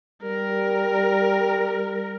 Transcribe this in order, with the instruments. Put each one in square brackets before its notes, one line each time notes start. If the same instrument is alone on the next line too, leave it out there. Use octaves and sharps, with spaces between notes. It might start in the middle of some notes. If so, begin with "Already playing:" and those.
[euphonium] G3 [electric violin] A#4